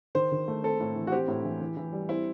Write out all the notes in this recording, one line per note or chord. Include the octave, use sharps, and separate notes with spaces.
D#3 C5
D#3
A3
C4 A4
A2
E3
F#4
C4 G4
A2
E3
E3
E3
G3
C4 E4